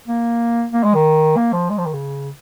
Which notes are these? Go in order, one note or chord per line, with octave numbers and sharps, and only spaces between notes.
A#3
A#3
G#3
D#3
A#3
F3
G#3
F3
D#3
C#3